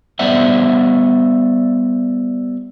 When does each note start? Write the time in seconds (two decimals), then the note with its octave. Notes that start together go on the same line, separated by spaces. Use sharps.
0.19 G3 B3 C5 D5 E5 F#5